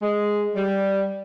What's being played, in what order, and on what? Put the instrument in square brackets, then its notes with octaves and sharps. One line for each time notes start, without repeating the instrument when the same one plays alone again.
[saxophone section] G#3
G3